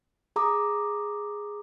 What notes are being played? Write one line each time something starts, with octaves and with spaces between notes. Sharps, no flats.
G#4 A#5 D6 D#6